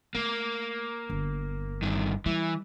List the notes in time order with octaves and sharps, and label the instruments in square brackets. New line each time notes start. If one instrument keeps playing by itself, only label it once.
[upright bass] A3 [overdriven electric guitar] A#3
[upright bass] G1
[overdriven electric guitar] G2 D#3
[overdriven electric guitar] E3 [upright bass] G3